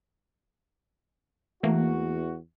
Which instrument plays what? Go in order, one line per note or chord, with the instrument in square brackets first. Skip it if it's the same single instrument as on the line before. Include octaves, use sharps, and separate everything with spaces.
[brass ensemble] E2 F#4 [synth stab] E3 A3 A#3